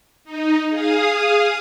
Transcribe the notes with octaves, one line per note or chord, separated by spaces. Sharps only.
D#4
G#4 F5 D#6